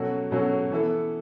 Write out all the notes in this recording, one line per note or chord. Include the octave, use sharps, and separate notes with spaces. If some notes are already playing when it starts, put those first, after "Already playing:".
Already playing: B2 F#3 C#4 F#4 A4
B2 F#3 C#4 F#4 A4
E3 B3 E4 A4